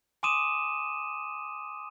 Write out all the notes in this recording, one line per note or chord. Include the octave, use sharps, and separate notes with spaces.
G#5 C6 D6 D#6 D#7 E7